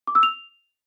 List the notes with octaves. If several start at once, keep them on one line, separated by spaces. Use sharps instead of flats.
D6
E6
F7